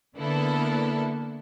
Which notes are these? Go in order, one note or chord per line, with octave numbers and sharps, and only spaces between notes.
D3 A#3 B3 E4 A4